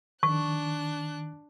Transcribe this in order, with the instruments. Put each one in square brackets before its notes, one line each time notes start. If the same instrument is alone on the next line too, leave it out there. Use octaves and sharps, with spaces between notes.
[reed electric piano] D#3 [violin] D4 F#6 [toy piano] C#6